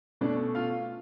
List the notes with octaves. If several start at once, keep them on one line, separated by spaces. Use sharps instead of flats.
B2 A3 C#4 D4 D5
F4 F5